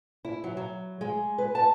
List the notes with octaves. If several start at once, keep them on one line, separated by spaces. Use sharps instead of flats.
E4
F#3
F#3
G#3
B4
A5